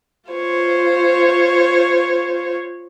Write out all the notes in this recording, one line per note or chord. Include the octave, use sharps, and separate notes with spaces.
F4 C5 C#5